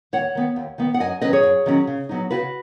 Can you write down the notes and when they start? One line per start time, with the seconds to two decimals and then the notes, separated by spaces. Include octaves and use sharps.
0.13 D#2 C#5 F#5
0.35 D#3 B3
0.56 D#2
0.78 D#3 B3
0.94 F#5
1.00 F#2 D#5 G#5
1.21 D#3 F#3 C#4 B4 D#5
1.33 G#4 C#5
1.43 F#2
1.66 D#3 F#3 C#4
1.87 C#3
2.09 F#3 B3 D#4
2.31 C#3 F#4 B4